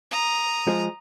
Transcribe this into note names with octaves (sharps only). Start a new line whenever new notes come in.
A#5 D#6
F3 G#3